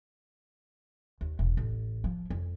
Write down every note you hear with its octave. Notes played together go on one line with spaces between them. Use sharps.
D#2
E1
A1
F3
F2